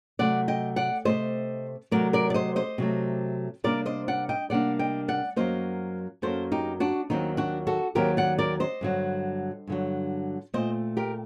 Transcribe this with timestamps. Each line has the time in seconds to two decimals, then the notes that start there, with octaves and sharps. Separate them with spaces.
0.19 C3 F#3 A3 D5 F#5
0.48 D#5 G5
0.76 D5 F#5
1.05 C3 F#3 A3 C5 D#5
1.91 C3 F#3 A3 A#4 D5
2.13 A#4 D5
2.30 D5
2.34 C5 D#5
2.56 C5 D#5
2.78 C3 F#3 A3
3.64 C3 G3 A#3 D4 A#4 D5
3.86 C5 D#5
4.08 D5 F#5
4.29 D#5 G5
4.50 C3 G3 A#3 D4 D5 F#5
4.79 D#5 G5
5.08 D5 F#5
5.36 F#2 F#3 A#3 C5 D#5
6.22 F#2 F#3 A#3 A4 C5
6.52 D#4 G4
6.80 D4 F#4
7.10 D#2 D#3 F#3 C4 D#4
7.37 D4 F#4
7.67 F#4 A4
7.95 D#2 D#3 F#3 C4 G4 A#4
8.17 D5 F#5
8.38 A#4 D5
8.60 C5 D#5
8.81 G2 D3 F#3
9.67 G2 D3 F#3
10.54 A#2 A3 C4 C5 D#5
10.97 G4 A#4